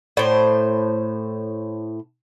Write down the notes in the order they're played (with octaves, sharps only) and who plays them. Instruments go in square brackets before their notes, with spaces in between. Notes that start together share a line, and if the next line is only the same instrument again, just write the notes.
[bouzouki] A2 C5